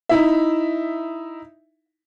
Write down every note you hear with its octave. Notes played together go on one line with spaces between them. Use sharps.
D#4 E4 E5